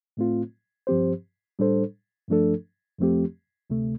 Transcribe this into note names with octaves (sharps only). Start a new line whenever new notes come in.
A2 A3 C4 F4
G2 F3 C4 G4 C5
A2 G3 D4 A4 C5
G2 F3 A3 D4 A4
F2 F3 A3 C4 G4
D2 C3 A3